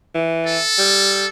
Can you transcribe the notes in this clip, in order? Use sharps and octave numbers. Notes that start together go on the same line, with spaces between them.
E3
A4
G3